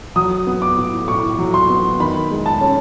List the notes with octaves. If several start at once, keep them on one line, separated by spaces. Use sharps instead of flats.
F#3 D#6
B3
D6
A2
A2 C#6
F#3
C6
B3
D#3 B5
G#3
A5
C#4